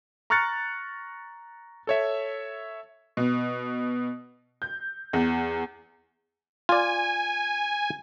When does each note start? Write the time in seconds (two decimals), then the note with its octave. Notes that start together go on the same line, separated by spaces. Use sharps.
0.30 A#5 C#6 F6 F#6 A6 C#7
1.87 A4 C#5 E5
3.17 B2
4.62 G6
5.13 E2
6.69 F4 D5 G#5